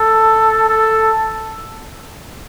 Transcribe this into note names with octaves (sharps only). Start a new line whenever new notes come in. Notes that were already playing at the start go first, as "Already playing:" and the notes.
Already playing: A4
A4